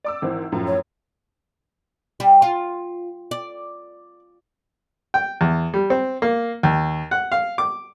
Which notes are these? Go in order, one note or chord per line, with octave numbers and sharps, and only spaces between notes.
D5 D6 E6
G#1 E3 C4
F#2 A2 F3
C#5
G3
F4
D5
G5
E2
G3
C4
A#3
D#2
F#5
F5
D6